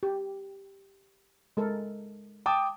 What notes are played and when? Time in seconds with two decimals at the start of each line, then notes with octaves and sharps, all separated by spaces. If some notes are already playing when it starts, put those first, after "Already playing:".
0.03 G4
1.57 G#3 A4 A#4
2.46 G5 A5 D6 D#6